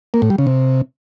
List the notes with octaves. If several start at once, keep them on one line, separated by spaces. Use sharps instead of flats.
A#3
A2
G3
C#3
C3